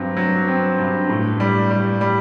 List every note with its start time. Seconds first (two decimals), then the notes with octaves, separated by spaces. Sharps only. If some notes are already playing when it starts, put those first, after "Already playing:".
Already playing: G2 F#3 C4
0.17 F#3
0.48 C4
0.78 G2
1.09 A2
1.40 G3
1.71 G3
2.01 G3